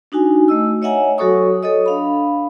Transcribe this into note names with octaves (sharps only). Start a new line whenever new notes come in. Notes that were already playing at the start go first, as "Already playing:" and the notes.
D4 D#4 F#4 G#5
A3 D#5 E6
C#5 D#5 E5 F#5 G#5 A#5
F#3 F#4 A4 C#5 C#6 D#6
A4 C#5 D#5 D#6
D4 F5 B5